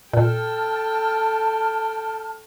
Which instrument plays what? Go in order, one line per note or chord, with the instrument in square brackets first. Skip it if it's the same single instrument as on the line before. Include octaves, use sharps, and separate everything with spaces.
[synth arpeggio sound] A#2 [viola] A4 G5 [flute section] A5 F6